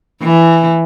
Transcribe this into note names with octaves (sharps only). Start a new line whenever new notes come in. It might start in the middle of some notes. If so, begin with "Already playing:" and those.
E3